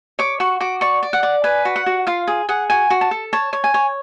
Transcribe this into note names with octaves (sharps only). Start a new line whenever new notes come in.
C#5 D6
F#4 C#6
F#4 D6
D5 C#6
D5
F#5
D5
B4 G#5
F#4
F#5
F#4
F4 F5
G#4
G#4 F#5
F#4 G#5
F#4
A5
A4
C#5 A5
C#5
G#5
C#5